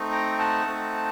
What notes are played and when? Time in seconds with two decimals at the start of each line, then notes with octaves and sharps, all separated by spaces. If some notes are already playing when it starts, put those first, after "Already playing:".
Already playing: A3 C4 D#4
0.11 G5 A#5
0.39 F#5 A5
0.65 A3 C4 D#4